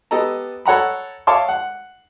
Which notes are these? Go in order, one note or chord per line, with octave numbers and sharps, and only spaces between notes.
B3 G4 A4 D#5 A#5
A4 C#5 F#5 A#5 B5
C#5 E5 F5 A5 C6 D6
F#5